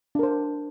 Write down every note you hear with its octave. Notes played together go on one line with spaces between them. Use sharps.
D4 A#4 C5